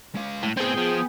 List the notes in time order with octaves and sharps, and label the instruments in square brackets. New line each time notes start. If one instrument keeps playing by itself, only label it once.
[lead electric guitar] G#3 F5
[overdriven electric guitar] A2
[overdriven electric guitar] A2 C4 [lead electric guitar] B3 [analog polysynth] G#4 G5
[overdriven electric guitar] F3